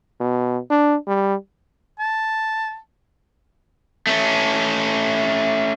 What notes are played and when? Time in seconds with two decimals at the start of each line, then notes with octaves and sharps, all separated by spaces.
0.20 B2
0.70 D4
1.07 G3
1.99 A5
4.07 A3 C#4